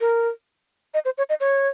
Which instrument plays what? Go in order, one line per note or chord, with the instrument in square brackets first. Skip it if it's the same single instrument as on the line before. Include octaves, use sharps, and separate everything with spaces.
[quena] A#4
D#5
C5
C#5
D#5
C#5